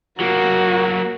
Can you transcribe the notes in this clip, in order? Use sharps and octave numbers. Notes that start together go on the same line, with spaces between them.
F#3 A#3 F#4 A#4